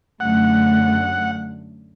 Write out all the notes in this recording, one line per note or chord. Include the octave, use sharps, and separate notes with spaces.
F#2 D3 A3 F#5